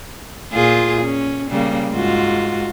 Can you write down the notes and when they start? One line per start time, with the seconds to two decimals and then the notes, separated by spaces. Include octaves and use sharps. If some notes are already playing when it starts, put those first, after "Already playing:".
0.53 A#2 F4 G#4
1.01 C#4
1.51 C#3 G3 A#3
1.91 G#2 F4 F#4